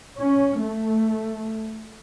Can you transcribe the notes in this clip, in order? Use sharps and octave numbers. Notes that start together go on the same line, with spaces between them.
C#4
A3